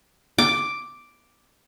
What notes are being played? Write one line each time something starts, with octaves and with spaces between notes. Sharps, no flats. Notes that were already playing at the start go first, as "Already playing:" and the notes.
D6